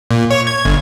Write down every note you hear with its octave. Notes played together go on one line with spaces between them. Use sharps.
A#2
C#5
G#6
G1